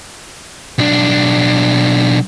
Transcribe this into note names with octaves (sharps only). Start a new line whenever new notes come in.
B1 D4